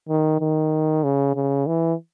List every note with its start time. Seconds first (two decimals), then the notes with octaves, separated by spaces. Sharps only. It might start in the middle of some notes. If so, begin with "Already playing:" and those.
0.09 D#3
0.41 D#3
1.04 C#3
1.35 C#3
1.67 E3